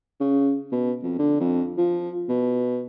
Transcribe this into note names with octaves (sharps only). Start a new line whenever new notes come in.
C#3
B2
F2
D3
F2
F3
B2